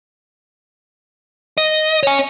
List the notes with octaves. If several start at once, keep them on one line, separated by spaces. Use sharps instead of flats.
D#5
C#5 G#5